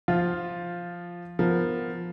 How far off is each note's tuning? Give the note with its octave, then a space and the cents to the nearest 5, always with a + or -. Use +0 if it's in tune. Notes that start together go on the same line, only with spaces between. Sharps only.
F3 +0 F4 +0
F3 +0 B3 +0 A#4 +5